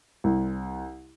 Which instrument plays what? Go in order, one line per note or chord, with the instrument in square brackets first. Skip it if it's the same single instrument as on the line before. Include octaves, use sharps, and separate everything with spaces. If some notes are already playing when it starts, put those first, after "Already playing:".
[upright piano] C2